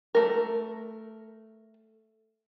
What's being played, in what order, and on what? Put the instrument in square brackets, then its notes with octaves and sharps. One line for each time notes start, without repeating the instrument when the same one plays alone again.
[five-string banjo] A3 A#4